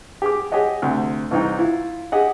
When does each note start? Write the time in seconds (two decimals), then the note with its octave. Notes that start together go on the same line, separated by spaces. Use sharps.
0.22 G4 G#4 D6
0.52 G4 G#4 C#5 D#5 F#5
0.82 D2 C3
1.31 C2 E3 D#4 G5
1.59 E4 F4
2.12 G4 G#4 D#5 F#5